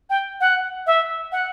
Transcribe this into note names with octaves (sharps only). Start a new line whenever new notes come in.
G5
F#5
E5
F#5